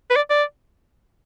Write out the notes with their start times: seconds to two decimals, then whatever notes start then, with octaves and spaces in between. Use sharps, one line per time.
0.10 B4
0.16 D5
0.30 D5